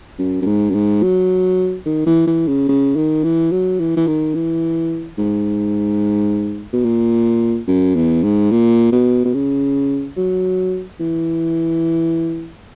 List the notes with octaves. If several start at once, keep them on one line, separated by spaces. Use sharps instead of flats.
F#2
F#2
G#2
F#2
G#2
F#3
D#3
E3
E3
C#3
C#3
D#3
E3
F#3
E3
E3
D#3
E3
G#2
B2
A#2
F#2
E2
G#2
A#2
B2
B2
C#3
F#3
E3